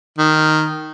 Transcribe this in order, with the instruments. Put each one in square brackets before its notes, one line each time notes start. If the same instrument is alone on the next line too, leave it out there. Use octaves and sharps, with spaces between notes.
[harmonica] D#3